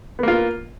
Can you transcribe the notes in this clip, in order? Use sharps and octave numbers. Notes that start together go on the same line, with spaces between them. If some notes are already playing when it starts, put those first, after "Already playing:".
A#3 B3 F4